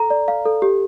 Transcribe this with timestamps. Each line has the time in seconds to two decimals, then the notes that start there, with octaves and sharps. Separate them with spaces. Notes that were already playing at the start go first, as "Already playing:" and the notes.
Already playing: A4 A#5
0.10 D5
0.28 F5
0.46 A4
0.62 G4